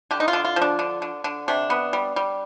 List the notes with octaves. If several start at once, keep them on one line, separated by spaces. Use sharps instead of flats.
D3 G4
D#4
F4
D3
F4
F3
D4
D3
D3
D3
C3 D4
B3
G3
G3